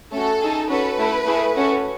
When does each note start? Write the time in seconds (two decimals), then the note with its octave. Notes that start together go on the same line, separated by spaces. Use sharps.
0.12 A3 C#4 F#4 A4
0.41 D#4 G#4
0.69 C#4 F#4 A4 B4
0.98 A3 E4 A4
1.27 A3 E4 G#4
1.55 C#4 F#4 A4